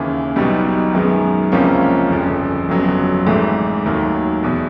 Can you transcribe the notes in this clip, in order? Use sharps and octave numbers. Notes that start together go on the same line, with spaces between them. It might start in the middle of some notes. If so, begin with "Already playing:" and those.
Already playing: D#2 C#3 E3
B1 B2 G3 B3 D#4
F#2 D#3 G#3 B3
C#2 C3 F3 A#3 C#4
G1 F2 C#3
G1 F2 C#3 F#3 B3
G#1 G#2 E3 A3
D#2 D#3 F#3 A3
E2 B2